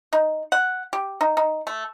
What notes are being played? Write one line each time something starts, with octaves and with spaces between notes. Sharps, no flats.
D#4
F#5
G4
D#4
D#4
A3